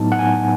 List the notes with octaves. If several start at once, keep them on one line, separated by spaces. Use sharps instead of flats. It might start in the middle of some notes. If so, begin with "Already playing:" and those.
Already playing: A2 F#3 B3 D#4 A5
F#5
G#5